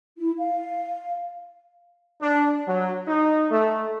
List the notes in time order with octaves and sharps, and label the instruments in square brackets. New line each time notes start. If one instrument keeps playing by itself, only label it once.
[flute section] E4
F5
[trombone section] D4
F#3
D#4
A3